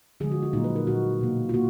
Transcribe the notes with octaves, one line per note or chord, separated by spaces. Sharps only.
D3 F3 G#3 G#4
F#4
F4
A#2 F#3 A#3 D#4
B4
A#4
A#2 F#3 A#3 F#4
B2 A#3
F4
A#3 F#4